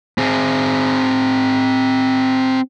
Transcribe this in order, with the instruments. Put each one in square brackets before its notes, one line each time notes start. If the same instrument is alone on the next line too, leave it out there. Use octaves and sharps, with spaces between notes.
[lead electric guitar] C4 G#4